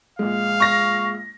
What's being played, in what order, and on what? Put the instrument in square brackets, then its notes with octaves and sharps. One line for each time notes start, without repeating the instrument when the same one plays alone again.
[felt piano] A#1 G#3 [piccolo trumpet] F5
[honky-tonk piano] C#6 A#6